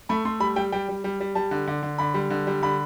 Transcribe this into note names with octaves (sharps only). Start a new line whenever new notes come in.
A3 B5
A3 C6
G3 B5
G3 G5
G3 G5
G3
G3
G3
G3 A5
D3
D3
D3
D3 B5
G3
D3
G3
D3 B5